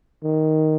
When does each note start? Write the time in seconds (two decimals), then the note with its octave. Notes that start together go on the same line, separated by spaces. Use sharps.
0.24 D#3